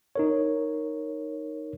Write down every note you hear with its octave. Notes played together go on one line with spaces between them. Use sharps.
D#4 A#4 C#5